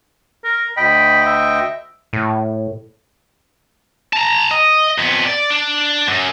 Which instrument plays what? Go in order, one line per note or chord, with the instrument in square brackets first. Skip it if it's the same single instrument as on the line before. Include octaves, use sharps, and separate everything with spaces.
[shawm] A#4
[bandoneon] D2 D#5 G5 [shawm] B5
[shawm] E5
[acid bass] A2
[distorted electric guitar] A5 A#5
D#5
F2 B3
D5
D4
F#2